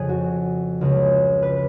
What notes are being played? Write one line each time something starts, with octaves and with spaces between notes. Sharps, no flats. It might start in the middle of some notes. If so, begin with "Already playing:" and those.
Already playing: F2 C#3 G#4
F#4
C#2 C#3 G#3
B4